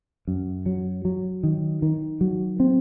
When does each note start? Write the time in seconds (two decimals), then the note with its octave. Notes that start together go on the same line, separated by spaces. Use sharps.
0.27 F#2
0.66 F#3
1.05 F#3
1.43 D#3
1.82 D#3
2.21 F#3
2.60 C4